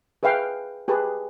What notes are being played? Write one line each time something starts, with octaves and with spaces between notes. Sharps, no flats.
G#4 B4 E5 F5 G5
G4 G#4 B4 A5